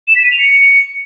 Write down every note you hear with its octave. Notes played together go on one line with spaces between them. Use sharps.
E7
B6
D#7
F7
C#7